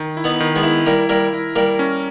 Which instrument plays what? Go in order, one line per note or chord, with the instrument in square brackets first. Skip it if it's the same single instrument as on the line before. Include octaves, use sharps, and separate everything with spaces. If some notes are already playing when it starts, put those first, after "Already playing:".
Already playing: [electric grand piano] D#3
E4
[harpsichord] B3 D#4
[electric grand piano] D#3
[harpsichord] G#3 B3
[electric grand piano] E4
[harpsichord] G3 A#3 [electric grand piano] A#4
[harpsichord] G3 A#3 [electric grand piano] A#4
[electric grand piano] E4
[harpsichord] G3 A#3 [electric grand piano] A#4
[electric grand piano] C#4